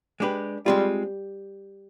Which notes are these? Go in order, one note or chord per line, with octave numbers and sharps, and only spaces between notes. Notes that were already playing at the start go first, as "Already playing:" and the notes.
G#3 D4 G4 B4
G3 G#3 C4 F4